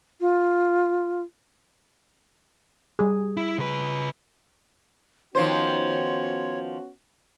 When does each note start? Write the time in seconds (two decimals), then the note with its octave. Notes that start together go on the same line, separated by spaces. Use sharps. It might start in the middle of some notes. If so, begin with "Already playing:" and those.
0.21 F4
2.99 G3 G#4
3.37 E4
3.58 C#3 B4
5.35 D#3 F3 B3 C#4 F#4 C5 C#5